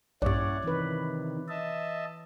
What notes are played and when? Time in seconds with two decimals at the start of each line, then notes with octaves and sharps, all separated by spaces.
0.22 A#1 G2 C#4 E4 C#5 D5 F#5
0.64 C3 D#3 E3 B4
1.49 D#5 E5 A5